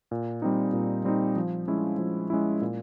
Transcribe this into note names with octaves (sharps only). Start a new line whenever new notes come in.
A#2
G3 C4 D#4
A#2
G3 C4 D#4
F3
G#3 C#4 E4
F3
G#3 C#4 E4
A#2